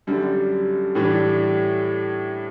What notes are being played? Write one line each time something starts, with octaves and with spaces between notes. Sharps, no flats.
F#2 D3 G3
A2 E3 G3 D4